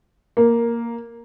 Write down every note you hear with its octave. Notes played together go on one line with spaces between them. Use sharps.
A#3